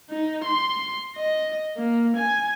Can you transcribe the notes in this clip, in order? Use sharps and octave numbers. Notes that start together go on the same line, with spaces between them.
D#4
C6
D#5
A#3
G#5